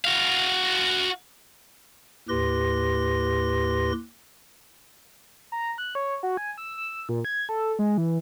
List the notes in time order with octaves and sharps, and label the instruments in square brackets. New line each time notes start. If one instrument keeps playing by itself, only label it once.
[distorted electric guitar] F#4 F5
[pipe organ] D#2 A2 G4 B4 C6 A#6
[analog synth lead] A#5
F#6
C#5
F#4
G#5
E6
E6
A#2
G#6
A4
G#3
E3